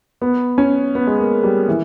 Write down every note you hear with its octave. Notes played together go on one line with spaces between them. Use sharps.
B3
C#4
B3
G#3
A#3
G3
E3